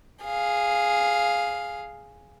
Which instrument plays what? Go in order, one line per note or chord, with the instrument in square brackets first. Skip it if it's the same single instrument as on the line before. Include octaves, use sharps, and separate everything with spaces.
[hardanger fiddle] G#4 F5